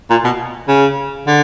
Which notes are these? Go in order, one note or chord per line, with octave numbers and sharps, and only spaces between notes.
A#2
B2
C#3
D3